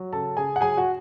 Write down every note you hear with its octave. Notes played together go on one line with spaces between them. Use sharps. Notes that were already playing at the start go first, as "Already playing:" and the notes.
Already playing: F#3
C#3 A4 A5
C#3 G#4 G#5
F#5
F#3 G#4 G#5
F#4 F#5